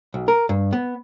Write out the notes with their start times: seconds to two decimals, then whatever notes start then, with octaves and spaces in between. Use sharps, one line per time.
0.14 B1
0.28 A#4
0.49 G2
0.73 B3